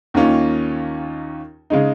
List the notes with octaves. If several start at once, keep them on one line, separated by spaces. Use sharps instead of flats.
D#2 D#3 A#3 C#4 F4
C#3 G#3 D#4